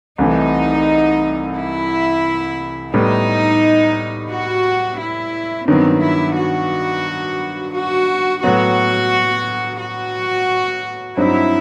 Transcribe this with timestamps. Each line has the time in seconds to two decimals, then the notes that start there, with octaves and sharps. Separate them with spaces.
0.18 C2 C3 E3 A3 D#4
1.55 E4
2.93 A2 G3 B3 D#4
4.30 F#4
4.99 E4
5.68 G2 D#3 F#3 B3 C4
6.02 E4
6.37 F#4
7.74 F#4
8.42 A2 F#3 B3 F#4
9.80 F#4
11.17 G2 F#3 C4 D#4 E4